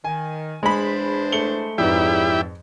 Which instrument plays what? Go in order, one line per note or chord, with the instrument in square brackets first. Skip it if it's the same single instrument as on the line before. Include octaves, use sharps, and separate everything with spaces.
[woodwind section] D#3 [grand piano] G#5
[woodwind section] E2 D4 C5 [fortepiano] G#3 B5
[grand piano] A3 C#7 G7
[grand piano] F2 G#2 B4 [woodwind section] F#3 G#4 D5 [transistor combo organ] E4 G4